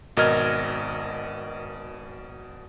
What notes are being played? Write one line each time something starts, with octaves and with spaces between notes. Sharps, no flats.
G#1 B2 A#4 D#5 F6 G#6